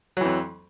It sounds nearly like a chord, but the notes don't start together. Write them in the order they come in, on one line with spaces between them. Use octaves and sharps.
F#3 E3 F2